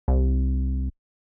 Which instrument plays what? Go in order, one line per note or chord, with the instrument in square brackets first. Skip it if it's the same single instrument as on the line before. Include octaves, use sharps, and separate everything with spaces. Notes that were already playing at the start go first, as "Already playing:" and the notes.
[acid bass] C2